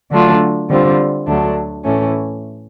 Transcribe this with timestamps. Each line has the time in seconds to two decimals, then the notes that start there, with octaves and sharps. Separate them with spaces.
0.11 D3 F#3 A3 D4 F4
0.70 D3 G3 C4 F4
1.27 D2 D3 F#3 A3 D4
1.85 A2 E3 A3 C#4